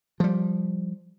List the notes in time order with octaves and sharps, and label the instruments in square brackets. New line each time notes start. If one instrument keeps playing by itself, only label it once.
[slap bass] F3 G3